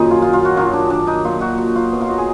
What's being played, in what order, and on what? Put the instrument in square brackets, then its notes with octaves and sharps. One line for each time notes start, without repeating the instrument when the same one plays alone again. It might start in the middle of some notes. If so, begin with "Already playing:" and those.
Already playing: [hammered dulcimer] F#2 A#2 D#3 F#3 D#4 G#4
F4
F4
F4
F#4
F#2 D#3 F#3 F4
D4
D4
D#4
A#2 F#3 F4
F#4
F#4
F4
B2 F#3
F4
F#4
G#4